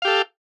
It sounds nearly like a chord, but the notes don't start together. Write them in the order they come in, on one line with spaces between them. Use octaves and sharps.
F5 G4 A4